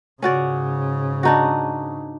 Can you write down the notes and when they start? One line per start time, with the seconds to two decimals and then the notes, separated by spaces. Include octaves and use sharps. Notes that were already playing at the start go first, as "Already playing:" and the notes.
0.22 G#2 C#3 C#4 F#4 D5
1.23 D4 D#4 F#4